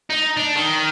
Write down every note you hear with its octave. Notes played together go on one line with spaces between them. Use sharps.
D#4
D4
D#3